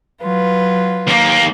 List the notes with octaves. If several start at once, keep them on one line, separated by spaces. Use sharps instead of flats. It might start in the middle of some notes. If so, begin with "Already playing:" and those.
F#3 F4 B4
D#2 A#3